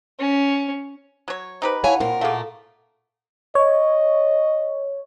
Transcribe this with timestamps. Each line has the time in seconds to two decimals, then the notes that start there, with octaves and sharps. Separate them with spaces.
0.20 C#4
1.28 F#3 C#5
1.62 D#4 G4 B4 C5
1.84 E4 C#5 F5 F#5 G#5 A5
2.00 A#2 C4 A#4
2.21 A3 A#3 A4 F5
3.55 C#5 D#5